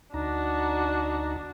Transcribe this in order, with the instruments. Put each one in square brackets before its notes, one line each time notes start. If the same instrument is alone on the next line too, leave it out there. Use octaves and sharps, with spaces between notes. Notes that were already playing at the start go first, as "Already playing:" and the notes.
[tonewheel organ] D2 D#4 A#5 [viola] D4 F#4